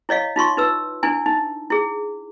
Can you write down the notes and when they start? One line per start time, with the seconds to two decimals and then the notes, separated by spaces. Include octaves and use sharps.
0.09 E4 C#5 D#5 F5
0.36 D#4 F4 C6 C#6
0.57 D#4 B4 E6
1.03 D4 E4 G#5
1.26 D#4
1.70 E4 G#4